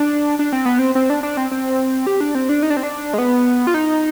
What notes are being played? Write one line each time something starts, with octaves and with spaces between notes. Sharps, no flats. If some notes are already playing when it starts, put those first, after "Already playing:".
Already playing: D4
D4
C4
B3
C4
C4
D4
D4
C4
C4
G4
D4
C4
D4
D#4
D4
C4
D4
G#3
B3
F4
D#4